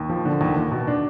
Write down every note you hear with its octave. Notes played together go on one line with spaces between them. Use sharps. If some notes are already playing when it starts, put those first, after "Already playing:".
Already playing: D#2
F3
D3
D#2
D#2
B2
D4